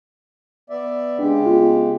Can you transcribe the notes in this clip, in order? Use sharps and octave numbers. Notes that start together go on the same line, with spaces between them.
B3 D5 E5
C#3 G#3 D4 G4
B3 F4